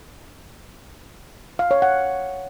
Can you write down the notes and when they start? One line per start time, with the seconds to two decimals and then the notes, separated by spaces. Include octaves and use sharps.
1.59 F5
1.71 C#5
1.82 F#5